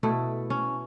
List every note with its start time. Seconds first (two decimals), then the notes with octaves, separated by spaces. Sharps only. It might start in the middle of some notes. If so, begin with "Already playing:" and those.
0.03 B2 A3 E4
0.50 C#4